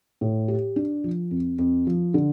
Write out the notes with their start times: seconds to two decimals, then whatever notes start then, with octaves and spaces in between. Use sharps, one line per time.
0.21 A2
0.48 G4
0.76 D4
1.04 F3
1.31 F2
1.58 F2
1.87 F3
2.14 D3